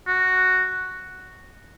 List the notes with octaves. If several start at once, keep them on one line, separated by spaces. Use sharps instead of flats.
F#4